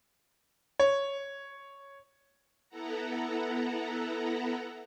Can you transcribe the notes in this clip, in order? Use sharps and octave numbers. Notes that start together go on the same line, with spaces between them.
C#5
B3 E4 A4 F#5 A#5